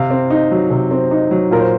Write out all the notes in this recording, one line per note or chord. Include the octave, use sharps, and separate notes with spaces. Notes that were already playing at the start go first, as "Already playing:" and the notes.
Already playing: C3 F5
C4
D#4
F#3
C3
C4
D#4
F#3
A#2 A#4
C5